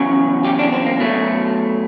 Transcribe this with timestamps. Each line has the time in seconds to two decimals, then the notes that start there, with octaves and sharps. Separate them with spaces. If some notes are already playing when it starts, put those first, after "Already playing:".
Already playing: E2 C#3 F#3
0.45 G4
0.59 D4
0.72 C4
0.86 A#3
1.00 B2 F#3 A3